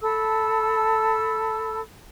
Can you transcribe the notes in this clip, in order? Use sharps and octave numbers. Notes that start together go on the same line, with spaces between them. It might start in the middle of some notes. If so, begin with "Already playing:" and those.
A4 A5 B5 E6